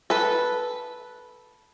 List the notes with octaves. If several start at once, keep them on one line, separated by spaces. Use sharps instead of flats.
A4 B4